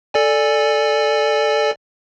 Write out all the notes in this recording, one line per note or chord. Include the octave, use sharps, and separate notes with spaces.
A4 D5 G#5